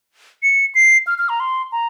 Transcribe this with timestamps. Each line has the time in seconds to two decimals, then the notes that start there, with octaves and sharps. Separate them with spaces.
0.43 C#7
0.75 C7
1.07 F6
1.18 F6
1.29 A#5
1.40 C6
1.72 A#5